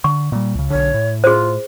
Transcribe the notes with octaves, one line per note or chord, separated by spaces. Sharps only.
D3 C#6
A#2 G3
C#2 C#3
B1 D3 C#5
A2
F4 G#4 C5